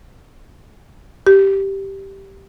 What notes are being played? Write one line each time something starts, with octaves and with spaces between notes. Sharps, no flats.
G4